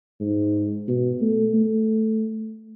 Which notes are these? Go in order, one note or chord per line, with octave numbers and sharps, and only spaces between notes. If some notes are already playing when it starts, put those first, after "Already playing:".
G#2
B2
A3
A3